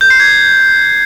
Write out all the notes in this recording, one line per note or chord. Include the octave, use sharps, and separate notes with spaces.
G6
C7
G#6